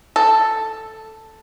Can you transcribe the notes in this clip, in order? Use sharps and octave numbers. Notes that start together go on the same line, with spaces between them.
A4